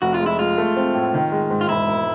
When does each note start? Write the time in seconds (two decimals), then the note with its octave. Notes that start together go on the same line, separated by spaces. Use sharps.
0.02 F1 F#4
0.14 F4
0.20 G#3
0.26 E4
0.39 G#3 F4
0.58 A3
0.76 C4
0.94 A2
1.14 D#3
1.32 G#3
1.50 G#2
1.61 F4
1.69 E1 E4
1.88 E1